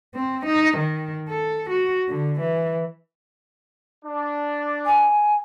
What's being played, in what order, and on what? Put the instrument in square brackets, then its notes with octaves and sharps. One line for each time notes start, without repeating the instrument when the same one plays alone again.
[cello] C4
D#4
D#3
A4
F#4
D3
E3
[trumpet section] D4
[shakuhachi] G#5